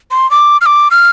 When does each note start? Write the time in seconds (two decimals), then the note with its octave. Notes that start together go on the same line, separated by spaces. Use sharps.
0.11 C6
0.31 D6
0.61 F6
0.66 D6
0.91 F6